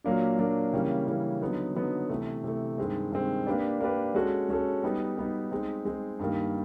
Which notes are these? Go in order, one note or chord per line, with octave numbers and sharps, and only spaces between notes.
A#2 F#3 A#3 D4
A#2 F#3 A#3 D4
C#3 E3 G3 A#3 C#4
C#3 E3 G3 A#3 C#4
D3 F#3 B3 D#4
D3 F#3 B3 D#4
C3 E3 A3
C3 E3 A3
G2 D#3 G#3 C4
G2 D#3 G#3 C4
A#3 D4 G4 B4 D5
A#3 D4 G4 B4 D5
G#3 C#4 F#4 A4
G#3 C#4 F#4 A4
G3 B3 D#4
G3 B3 D#4
G#3 C4 D#4
G#3 C4 D#4
G2 D#3 G3 A#3